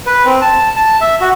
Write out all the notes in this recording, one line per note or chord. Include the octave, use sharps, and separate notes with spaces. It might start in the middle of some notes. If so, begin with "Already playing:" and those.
B4
C4
A5
A5
E5
F#4